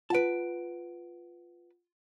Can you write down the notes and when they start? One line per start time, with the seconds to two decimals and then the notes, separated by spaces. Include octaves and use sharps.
0.10 F4 B4 F#5 A5 D7